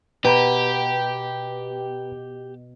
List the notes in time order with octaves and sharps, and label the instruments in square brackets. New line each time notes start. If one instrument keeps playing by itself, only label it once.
[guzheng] B2 [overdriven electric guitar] G4 [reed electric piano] B4 A#5 B5